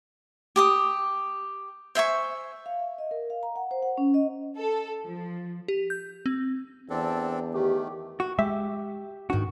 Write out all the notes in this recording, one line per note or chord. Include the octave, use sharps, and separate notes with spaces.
G4 D6 D#6
C5 E5 G#5 C#6
F5
E5
D#5
A#4
F5
A#5
F#5
C5
F#5
C#4
D#5
A4
F3
G4
G6
C4
E2 C4 D4 A4
D#3 A3 G4
F#4
G#3 G4 E5
G#2 D#3 D4 F#4